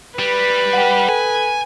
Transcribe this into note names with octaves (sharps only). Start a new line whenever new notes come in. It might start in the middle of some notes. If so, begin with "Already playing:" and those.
G3 B4
F#5 G5
A4 G#5